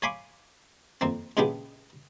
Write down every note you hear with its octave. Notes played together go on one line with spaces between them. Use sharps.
C#5 F5 G#5 B5 C6 D6
F2 A#3 C4
A#2 C#3 G#3 B3 D4 G4